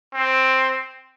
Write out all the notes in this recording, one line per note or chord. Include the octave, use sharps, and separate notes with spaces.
C4